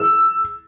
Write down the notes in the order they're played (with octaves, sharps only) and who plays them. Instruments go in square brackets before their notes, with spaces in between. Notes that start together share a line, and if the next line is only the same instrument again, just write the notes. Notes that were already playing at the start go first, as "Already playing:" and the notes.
Already playing: [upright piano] E6